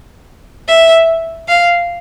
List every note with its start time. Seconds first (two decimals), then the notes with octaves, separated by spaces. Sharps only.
0.68 E5
1.48 F5